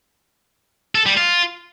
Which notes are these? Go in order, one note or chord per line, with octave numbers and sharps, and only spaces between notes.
A4
G3
F4